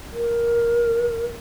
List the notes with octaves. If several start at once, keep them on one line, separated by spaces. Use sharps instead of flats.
A#4